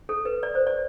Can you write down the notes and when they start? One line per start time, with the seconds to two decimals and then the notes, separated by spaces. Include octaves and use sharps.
0.09 A4
0.25 B4
0.43 D5
0.55 C5
0.67 D5